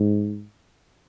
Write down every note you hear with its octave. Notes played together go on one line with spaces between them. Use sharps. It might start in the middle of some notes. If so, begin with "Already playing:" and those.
Already playing: G#2